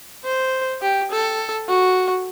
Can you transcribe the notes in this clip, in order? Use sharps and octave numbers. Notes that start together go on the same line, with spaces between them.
C5
G4
A4
F#4